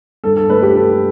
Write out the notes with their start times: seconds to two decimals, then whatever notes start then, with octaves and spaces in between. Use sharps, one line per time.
0.24 G2 A4
0.37 A4
0.50 A3 B4
0.63 G4
0.75 A3 A4